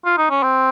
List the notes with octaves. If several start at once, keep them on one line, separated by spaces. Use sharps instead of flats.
F4
D#4
C#4
C4